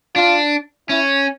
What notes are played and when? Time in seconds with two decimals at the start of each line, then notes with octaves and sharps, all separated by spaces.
0.16 D4 F4
0.89 C#4 E4